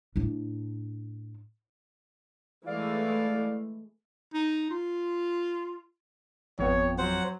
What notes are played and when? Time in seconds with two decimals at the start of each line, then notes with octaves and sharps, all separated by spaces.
0.16 A2 D4
2.67 E3 G#3 A3 D5 F5
4.34 D#4
4.71 F4
6.59 G#1 F2 B3 C#5
6.98 F#3 C5 F#5